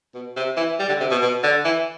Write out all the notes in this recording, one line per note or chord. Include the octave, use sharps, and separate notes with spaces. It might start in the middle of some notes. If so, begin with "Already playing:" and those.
B2
C3
E3
G3
D3
C3
B2
B2
D3
E3